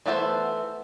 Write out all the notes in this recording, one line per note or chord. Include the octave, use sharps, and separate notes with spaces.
E3 A3 B3 A4 C5